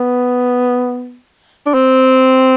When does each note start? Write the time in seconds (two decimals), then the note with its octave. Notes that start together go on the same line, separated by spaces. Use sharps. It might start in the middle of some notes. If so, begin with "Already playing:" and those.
Already playing: B3
1.66 D4
1.74 C4